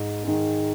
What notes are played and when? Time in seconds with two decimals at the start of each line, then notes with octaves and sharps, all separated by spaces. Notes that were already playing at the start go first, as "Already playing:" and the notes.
Already playing: G#2
0.23 D#3 G#3